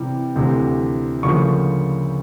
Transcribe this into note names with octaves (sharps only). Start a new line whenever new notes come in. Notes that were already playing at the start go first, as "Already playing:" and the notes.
Already playing: C3 E3 G3
D2 C3 E3
D2 C#3 F3 A#3 C#6